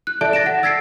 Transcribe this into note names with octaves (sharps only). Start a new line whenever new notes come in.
F#6
A4 D5 E5 A5 D7
A6 A#6 D7 E7
F#5
E6 G#6 A6 B6 C7 D7